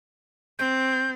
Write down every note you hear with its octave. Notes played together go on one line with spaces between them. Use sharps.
C4 G6